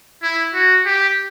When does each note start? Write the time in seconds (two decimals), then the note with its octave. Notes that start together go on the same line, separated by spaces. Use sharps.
0.23 E4
0.54 F#4
0.86 G4